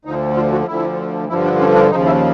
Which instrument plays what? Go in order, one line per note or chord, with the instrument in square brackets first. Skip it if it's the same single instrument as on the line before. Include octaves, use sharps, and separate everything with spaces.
[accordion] D2 D3 F3 D#4
F4
F#4
D2 D3 F3 E4
G2 D3 F3 E4
D4
C#4
D4
D#2 C#3 F3 D#4
E4